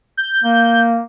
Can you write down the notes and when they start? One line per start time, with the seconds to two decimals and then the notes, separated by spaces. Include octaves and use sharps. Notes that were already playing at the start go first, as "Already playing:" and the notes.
0.17 G6
0.44 A#3